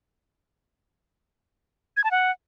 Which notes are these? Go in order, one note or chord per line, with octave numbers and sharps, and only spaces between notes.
G#6
A5
F#5